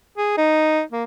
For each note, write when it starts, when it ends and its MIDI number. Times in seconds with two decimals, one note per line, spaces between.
0.18 0.33 68
0.38 0.82 63
0.92 1.04 58